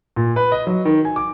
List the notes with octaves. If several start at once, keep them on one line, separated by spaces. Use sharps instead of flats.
A#2
B4
D#5
F#3
D#3
G#5
D6